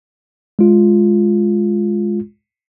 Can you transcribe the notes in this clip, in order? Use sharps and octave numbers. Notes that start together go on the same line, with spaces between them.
G#3 F4